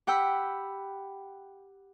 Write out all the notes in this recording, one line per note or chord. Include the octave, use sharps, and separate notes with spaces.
G4 F#5 G5 B5 E6